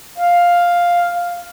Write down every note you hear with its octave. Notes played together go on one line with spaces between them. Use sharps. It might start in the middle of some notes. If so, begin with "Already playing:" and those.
F5